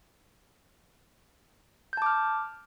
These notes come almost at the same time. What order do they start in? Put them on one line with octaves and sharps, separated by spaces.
G6 A5 D6 F6